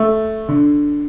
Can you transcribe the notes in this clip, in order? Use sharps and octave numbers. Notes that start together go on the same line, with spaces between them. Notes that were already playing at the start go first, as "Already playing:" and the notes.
Already playing: A3
D3